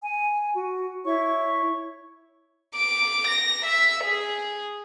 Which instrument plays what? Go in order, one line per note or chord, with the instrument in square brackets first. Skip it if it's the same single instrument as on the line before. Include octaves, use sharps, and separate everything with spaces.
[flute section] G#5
F#4
E4 C#5 C#6
[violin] D6
A#6
E5
G#4